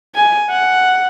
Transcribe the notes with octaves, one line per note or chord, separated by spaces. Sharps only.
G#5
F#5